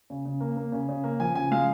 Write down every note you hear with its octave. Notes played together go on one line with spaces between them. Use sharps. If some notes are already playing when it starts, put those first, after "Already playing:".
C#3
C#3
A#3
A#3
C#3
C#3
A#3
F3 G#5
C#3 G#5
G#3 F5